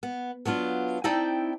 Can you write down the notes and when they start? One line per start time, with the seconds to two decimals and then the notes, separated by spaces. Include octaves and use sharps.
0.03 B3
0.45 F#3 B3 D4 F4
1.04 C4 D#4 E4 D5 G5 A5